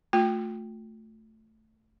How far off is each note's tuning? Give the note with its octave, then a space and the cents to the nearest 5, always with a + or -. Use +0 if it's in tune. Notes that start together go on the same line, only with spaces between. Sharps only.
A3 +0 F4 +40 G5 +0